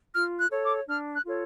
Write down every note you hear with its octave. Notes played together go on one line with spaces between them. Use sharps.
F4 F6
F#6
A4 C#5
D6
D4 F6
F#6
F4 A4 C#5